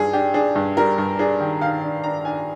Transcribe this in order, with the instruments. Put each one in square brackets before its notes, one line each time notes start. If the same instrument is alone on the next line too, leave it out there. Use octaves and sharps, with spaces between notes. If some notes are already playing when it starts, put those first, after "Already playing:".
Already playing: [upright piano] G2 D4 G#4
D4 G4
D4 G#4
G2
G3 A#4
G2
D4 G#4
D#3
D#3 F5
D4
D4 A#5
D4 G#5